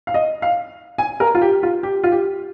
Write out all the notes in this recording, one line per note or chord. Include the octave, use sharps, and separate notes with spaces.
F5
D#5
F5
G#5
A#4
F4
G4
F4
G4
F4
G4